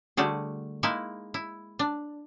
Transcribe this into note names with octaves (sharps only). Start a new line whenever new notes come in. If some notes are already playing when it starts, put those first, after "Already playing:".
D3 G3 A3 F#4 G#4
G#3 A#3 D#4 E4 G#5
E4
D4